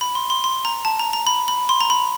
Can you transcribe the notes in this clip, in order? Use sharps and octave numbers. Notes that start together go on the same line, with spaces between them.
B5
C6
C6
C6
A#5
A5
A#5
A#5
B5
B5
C6
A#5
B5